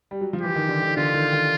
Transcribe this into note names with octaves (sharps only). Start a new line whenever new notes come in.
G3
F#3
F3
E3 G4
D#3
D3
D#3
D3 F4
D#3
D#3